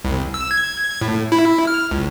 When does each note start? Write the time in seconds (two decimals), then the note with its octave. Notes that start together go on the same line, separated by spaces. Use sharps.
0.05 C2
0.34 E6
0.51 G#6
1.01 A2
1.32 E4
1.67 F6
1.91 C#2